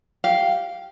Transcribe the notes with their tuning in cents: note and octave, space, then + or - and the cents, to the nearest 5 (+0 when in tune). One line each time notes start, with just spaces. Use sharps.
G4 -15 F5 +0